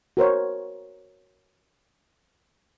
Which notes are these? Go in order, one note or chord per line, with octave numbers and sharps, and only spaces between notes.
F#4 A#4 C5 C#5